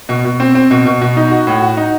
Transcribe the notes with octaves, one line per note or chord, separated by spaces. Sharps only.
B2
B2
C4
C4
B2
B2
B2
D#4
F#4
A2
F#4
D#4